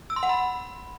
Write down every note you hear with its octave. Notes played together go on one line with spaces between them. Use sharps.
E6
C6
F#5
B5